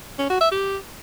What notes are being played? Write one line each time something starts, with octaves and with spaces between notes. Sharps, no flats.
C#4
F#4
E5
G4